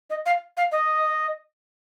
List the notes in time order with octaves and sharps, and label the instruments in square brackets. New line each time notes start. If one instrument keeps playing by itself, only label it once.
[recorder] D#5
F5
F5
D#5